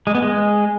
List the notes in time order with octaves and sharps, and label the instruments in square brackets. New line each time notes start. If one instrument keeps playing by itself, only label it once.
[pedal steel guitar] G#3
B3
G#3